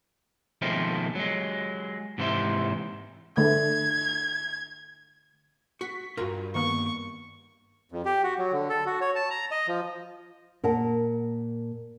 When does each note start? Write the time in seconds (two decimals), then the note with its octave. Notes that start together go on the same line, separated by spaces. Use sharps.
0.62 B2 D#3 F3 G#3 A3 C4
1.15 F#3 G#3
2.18 G#2 C3 E3 C5 E5
3.37 D3 A3 G#6
5.81 F#4 C#6 B6
6.17 C#2 G2 F4 F#4 A#4 A#5
6.55 D#3 A#3 B3 C#6
7.92 F2
8.05 G4
8.23 F#4
8.39 F#3
8.52 D3
8.70 A4
8.86 F#4
9.01 C#5
9.15 A5
9.30 A#5
9.51 D#5
9.68 F3
10.64 A#2 A#4 F#5 A5